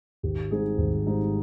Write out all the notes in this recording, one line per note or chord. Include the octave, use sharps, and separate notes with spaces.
G#1 G4
G#2 G3 C4 D#4 G#4
G#1
G#2 G3 C4 D#4